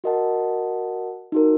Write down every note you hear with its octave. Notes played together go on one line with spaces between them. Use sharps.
F#4 A#4 D#5 F#5 A5
D#4 F#4 A#4